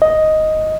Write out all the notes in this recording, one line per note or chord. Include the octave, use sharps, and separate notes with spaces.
D#5